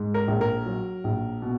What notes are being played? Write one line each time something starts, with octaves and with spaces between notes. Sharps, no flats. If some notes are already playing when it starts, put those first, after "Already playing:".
Already playing: G#2
A#4
A#1
A#4
F#3
A#1
B2